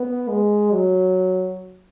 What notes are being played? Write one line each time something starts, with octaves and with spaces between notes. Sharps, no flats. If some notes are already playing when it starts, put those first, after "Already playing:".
Already playing: B3
G#3
F#3